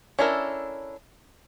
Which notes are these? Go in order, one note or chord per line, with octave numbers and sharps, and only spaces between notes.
C#4 D4 E4 A4 A#4